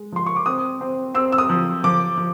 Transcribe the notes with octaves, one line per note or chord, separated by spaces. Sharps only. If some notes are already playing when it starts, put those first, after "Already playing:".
Already playing: G#3
F3 C6
C#6
D6
C4 D#6
C4
C4 E6
E6
D#6
F3
F3 D6
F3